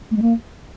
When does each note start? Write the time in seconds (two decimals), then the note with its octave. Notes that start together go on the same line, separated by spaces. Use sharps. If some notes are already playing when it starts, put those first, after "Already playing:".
0.11 A3
0.16 G#3
0.22 A#3